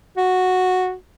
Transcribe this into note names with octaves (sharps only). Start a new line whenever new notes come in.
F#4